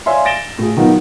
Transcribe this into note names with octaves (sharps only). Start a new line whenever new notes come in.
C#5 D5 E5 F5 G#5 C6
A6 A#6 D7 E7 G7
A2 F4 G#4
D#3 F#3 B3 D#4 F4 F#4